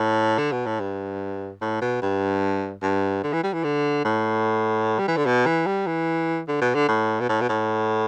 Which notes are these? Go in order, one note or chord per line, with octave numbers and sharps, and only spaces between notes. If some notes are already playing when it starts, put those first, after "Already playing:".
Already playing: A2
D3
B2
A2
G2
A2
B2
G2
G2
D3
E3
G3
E3
D3
A2
G3
E3
D3
B2
E3
G3
E3
D3
B2
D3
A2
B2
A2
B2
A2